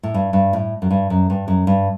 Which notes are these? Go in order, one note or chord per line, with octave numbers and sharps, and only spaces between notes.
A2
G2
G2
A2
F#2
G2
F#2
G2
F#2
G2